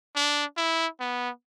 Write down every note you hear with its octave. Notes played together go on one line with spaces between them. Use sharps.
D4
E4
B3